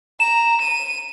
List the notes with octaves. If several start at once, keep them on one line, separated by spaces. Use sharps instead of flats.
A#5 E7
D#7